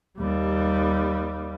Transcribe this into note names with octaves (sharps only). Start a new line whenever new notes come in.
D#2 G3